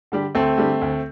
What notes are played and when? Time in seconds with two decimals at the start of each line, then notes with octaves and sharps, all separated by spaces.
0.12 D3 G3 D4 G4
0.35 D2 A3 C4
0.57 D3 G3 D4 G4
0.81 D2